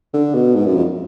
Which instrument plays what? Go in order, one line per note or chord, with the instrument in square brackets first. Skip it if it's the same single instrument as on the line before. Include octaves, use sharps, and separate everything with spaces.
[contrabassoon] D3
B2
G#2
F#2
F2